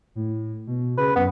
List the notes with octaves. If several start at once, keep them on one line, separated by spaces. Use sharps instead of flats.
A2
B2
C#3 B4
F#2 B3